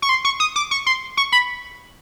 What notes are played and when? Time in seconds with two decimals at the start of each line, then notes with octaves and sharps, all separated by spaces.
0.02 C#6
0.09 C6
0.25 C#6
0.40 D#6
0.56 D6
0.71 C#6
0.86 C6
1.17 C#6
1.32 B5